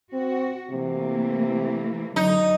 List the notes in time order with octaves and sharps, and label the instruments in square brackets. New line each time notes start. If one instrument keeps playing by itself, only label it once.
[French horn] C4 [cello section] F#4
[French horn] C3 [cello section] E3 A3 A#3
[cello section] F#2 D3 F#3 [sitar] D#4